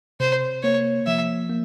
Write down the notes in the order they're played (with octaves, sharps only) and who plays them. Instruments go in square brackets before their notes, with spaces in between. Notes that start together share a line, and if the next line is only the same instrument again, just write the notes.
[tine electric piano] C3 [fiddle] C5
[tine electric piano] A#3 [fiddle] C#5
[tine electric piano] F3 [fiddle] E5
[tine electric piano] A#3